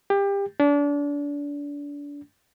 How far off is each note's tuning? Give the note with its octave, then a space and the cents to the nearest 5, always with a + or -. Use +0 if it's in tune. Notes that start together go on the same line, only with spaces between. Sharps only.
G4 +25
D4 -30